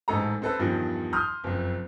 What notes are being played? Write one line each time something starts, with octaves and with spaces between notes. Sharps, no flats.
A1 G#2 A4 D#5 A#5
C4 A4 B4
E2 G2 D#3 F3
C6 D#6 F6 G6
F#1 F2